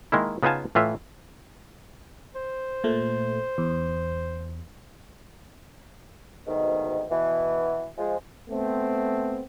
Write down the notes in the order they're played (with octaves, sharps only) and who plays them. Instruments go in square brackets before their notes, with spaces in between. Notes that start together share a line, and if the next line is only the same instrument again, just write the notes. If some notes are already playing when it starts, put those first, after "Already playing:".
[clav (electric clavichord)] D#3 G#3 A#3 E4
C#3 B3 D#4 F4 G#5 A5
A2 E3 F4 E5
[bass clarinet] C5
[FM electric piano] A#2 A3
E2
[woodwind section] D2 G#2 B2 D#3
B2 E3
F3 G#3
[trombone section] A3 B3 C4